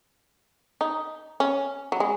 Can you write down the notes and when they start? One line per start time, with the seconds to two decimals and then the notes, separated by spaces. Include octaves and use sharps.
0.81 D#4
1.40 C#4
1.92 F#3
2.00 G#3